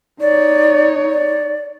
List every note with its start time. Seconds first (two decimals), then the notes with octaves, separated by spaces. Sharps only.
0.21 D#4 C#5 D5
1.10 D5